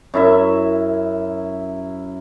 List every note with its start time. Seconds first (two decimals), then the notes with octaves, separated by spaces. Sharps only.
0.14 F#2 E4 E5